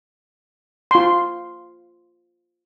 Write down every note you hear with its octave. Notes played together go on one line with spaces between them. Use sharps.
F4 C6